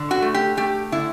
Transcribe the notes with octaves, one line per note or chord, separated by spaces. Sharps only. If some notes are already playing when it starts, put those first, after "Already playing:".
Already playing: D3
F#4
A3
G4
A3 G4
D3 E4